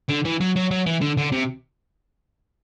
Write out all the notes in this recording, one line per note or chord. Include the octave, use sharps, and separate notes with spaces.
D3
E3
F#3
F#3
F#3
E3
D3
D3
C3